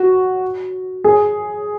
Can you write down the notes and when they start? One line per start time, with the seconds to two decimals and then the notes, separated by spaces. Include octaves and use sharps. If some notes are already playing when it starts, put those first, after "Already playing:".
Already playing: F#4
1.04 G#4